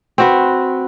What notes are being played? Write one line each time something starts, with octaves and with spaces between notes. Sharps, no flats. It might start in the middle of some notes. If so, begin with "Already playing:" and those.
C4 F#4 B4